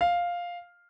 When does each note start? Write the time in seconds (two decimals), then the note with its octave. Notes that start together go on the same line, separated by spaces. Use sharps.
0.01 F5